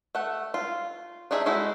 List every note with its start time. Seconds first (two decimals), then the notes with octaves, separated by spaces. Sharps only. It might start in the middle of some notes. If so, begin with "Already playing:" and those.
0.15 A3 F#5
0.54 F4
1.31 D4 D#4 G#4 D#5 E5
1.46 G#3 A3 E4 F#4